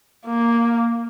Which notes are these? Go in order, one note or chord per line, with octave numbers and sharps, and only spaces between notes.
A#3